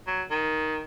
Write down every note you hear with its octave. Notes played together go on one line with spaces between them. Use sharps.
F#3
D#3